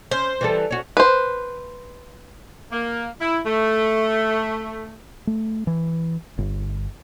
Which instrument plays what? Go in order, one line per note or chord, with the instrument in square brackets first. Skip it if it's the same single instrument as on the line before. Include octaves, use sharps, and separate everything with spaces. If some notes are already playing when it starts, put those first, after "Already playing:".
[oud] C#4 [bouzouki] C5
[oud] E3 G3 A4
C#4 F#4
[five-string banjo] B4 C5
[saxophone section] A#3
E4
A3
[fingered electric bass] A3
E3
G1